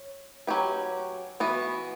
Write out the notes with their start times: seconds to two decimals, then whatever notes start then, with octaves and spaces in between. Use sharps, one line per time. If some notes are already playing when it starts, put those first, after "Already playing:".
Already playing: C#5
0.47 F#3 C#4 G4 B4
1.40 E3 B3 F#4